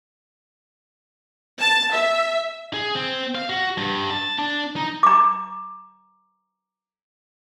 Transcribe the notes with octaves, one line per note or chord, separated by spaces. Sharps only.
A5
E5
G#4
C4
F5
F#4
G2
A5
D4
D#4
A#5 D6